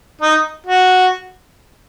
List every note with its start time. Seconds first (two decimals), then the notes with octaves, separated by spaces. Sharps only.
0.21 D#4
0.66 F#4